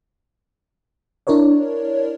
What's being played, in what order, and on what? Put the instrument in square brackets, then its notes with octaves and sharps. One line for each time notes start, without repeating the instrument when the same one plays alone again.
[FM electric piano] D4 E4 A#4 C#5 D5